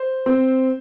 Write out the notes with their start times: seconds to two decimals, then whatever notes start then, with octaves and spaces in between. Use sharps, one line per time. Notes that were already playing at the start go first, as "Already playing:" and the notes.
Already playing: C5
0.26 C4